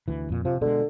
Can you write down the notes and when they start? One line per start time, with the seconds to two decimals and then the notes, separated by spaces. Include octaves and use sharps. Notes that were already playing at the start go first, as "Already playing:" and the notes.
0.08 D2 E3
0.30 F2 A#2
0.45 C3 F3
0.61 B2 D3 G#3